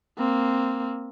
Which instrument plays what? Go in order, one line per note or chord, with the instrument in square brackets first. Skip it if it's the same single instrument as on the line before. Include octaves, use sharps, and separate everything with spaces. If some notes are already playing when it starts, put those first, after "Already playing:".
[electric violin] A#3 C4